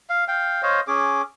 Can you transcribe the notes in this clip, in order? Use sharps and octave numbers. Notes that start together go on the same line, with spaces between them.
F5
F5 G5
C5 C#5 D#5 F5
C#4 G#4 D6